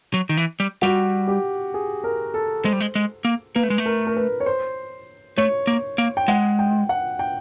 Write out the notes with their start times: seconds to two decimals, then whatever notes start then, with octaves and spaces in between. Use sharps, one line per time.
0.14 F#3
0.29 D#3
0.37 E3
0.60 G3
0.82 G3 F#4
1.28 G4
1.74 G#4
2.04 A#4
2.34 A4
2.64 G#3 C5
2.73 G3
2.80 G#3
2.95 G#3
3.25 A#3
3.55 A#3 B4
3.63 A3
3.70 G#3
3.78 A3
3.86 A#4
4.07 A#4
4.17 B4
4.40 C#5
4.46 C5
5.38 A3 C#5
5.67 A#3
5.98 A#3
6.17 G5
6.28 G#3 F#5
6.59 G5
6.89 F#5
7.19 G5